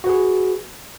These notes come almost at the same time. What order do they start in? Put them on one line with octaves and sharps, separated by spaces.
F#4 B4 G#4